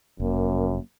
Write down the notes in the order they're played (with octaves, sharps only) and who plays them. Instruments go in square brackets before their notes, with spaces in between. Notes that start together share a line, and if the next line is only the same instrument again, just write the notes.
[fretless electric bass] F1 [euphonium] F#2 [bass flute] A#3